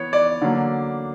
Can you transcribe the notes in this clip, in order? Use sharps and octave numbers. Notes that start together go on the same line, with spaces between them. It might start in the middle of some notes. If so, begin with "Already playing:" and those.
Already playing: E3 B3 C#5
D5
D3 F#3 A#3